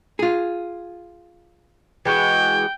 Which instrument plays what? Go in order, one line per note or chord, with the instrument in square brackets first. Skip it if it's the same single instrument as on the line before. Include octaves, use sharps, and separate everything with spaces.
[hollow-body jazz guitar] F4 G#4
[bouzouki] E3 G#3 F#4 [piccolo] G5